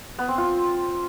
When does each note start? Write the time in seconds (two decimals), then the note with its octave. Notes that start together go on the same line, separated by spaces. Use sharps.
0.19 B3
0.28 C4
0.38 F4